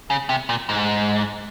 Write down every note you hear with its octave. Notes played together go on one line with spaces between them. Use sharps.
C#3
C3
A#2
G#2